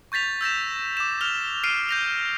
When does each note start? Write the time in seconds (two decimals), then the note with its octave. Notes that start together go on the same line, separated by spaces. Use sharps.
0.12 C#6 G6 A6 B6 F7
0.41 E6 G6 A#6 E7
0.97 D6 E7
1.21 F6 F7 G7
1.64 F6 C7 D7 D#7
1.89 G6 A#6 F7